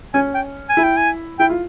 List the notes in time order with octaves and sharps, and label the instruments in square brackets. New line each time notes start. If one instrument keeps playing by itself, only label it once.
[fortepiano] C#4 [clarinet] G#5
[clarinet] G5
G#5
[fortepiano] E4
[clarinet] G5
G#5
[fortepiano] E4 [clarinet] G5
[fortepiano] F4